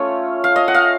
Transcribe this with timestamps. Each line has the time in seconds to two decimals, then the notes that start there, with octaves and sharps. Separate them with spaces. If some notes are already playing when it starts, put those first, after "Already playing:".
Already playing: A3 C#4 F4 C#5
0.44 F5
0.56 D#5
0.68 F#5
0.74 F5